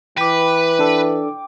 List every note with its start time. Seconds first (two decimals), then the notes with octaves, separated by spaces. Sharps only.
0.18 E3 B4 G5 D6
0.79 D4 A4